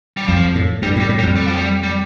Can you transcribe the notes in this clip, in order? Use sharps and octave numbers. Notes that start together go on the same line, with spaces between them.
G3
F2 F3
A2
G2 G3
A2 G3
A2
G3
F2
G3
F3
G3
G3